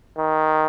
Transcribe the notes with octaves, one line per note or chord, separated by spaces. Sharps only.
D#3